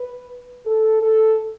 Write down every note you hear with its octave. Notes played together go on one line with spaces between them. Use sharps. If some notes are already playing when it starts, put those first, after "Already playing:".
Already playing: B4
A4
A4